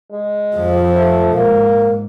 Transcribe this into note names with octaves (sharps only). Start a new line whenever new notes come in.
G#3
F2 F3
A3
G#2 A#3